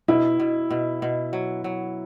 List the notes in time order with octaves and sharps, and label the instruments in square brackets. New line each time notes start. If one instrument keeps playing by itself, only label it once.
[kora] B2 [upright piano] E4
[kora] B2
B2
B2
F#3
F#3